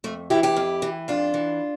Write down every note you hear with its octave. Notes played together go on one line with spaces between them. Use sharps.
F2 A3
E3 E4 G4
E4 G4
F2
E3
F2 D4 F4
E3